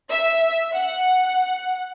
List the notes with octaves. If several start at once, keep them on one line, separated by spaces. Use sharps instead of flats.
E5
F#5